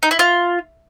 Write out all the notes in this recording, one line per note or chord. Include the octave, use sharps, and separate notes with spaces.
D#4
E4
F4